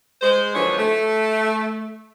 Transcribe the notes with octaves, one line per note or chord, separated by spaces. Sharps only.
G#3 C5
D3 F3 F#3 G#3 B3 C#5
A3